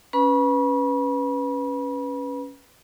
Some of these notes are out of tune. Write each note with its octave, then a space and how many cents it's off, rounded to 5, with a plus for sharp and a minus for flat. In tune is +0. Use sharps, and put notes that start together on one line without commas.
C#4 +0 B4 +0 B5 -35